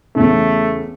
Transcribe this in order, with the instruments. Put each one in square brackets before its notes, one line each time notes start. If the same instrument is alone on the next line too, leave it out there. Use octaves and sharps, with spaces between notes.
[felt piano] E2 C#3 [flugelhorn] A3